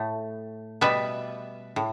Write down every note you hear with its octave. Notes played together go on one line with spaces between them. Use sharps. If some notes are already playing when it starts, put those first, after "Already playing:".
Already playing: A2 A3
B2 G3 B3 B4 E5
A2